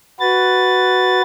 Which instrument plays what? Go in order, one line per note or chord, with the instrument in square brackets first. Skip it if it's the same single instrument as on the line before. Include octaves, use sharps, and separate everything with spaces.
[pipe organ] F#4 B4 A6